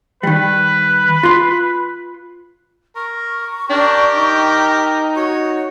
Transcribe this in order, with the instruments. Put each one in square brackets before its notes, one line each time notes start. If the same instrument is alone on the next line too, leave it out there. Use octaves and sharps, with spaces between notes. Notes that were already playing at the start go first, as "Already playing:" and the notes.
[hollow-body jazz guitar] D#3 G3 [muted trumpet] B4
[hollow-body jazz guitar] F4 C6
[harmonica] A#4 [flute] C#6
[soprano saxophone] D4 [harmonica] G4 A#4 G5
[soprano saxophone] D#4
[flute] F#4 [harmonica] C#5